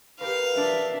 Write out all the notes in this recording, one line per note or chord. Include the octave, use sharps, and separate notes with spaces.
G4 A#4 B4 F5
D4 E5